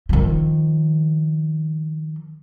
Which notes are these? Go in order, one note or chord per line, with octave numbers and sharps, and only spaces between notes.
D#3 F3